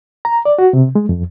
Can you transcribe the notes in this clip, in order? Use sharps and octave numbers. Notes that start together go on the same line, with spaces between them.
A#5
D5
F#4
C3
G#3
F2